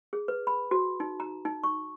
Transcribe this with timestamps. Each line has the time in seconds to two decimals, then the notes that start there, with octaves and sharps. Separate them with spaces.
0.13 G#4
0.28 B4
0.47 B5
0.71 F#4
1.00 D#4
1.20 A#5
1.45 D#4
1.64 C#6